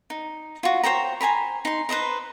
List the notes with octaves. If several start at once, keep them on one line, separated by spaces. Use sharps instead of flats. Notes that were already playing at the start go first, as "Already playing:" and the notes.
D#4
F4 F#4
C5 C#5 G5 A#5
C5 G#5 A#5 B5
D#4 C6
B4 C5 D#5 A#5